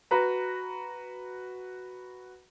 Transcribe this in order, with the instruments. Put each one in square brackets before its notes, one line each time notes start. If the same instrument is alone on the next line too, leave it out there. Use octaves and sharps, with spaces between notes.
[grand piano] F#4 B4 A#5